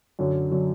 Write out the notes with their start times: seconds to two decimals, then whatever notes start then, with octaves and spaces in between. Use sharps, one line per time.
0.19 F#2 D3 F#3
0.51 D3 F#3